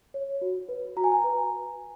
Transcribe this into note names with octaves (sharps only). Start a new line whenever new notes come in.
C#5
F#4
B4
F#4 A#5
G#5
A#5
B4